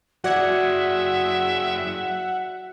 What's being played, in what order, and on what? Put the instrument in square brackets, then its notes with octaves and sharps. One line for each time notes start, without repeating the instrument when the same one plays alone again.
[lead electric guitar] F#2 G#4 [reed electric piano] F#4 D5 G#6 [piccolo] E5 [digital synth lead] F#5